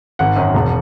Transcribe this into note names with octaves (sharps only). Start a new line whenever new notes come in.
G#1 F#5
F#2 D#3
E1